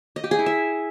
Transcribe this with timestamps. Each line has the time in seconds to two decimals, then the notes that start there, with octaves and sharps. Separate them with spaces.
0.16 D#5
0.24 G4
0.31 G#4
0.39 E4
0.46 E5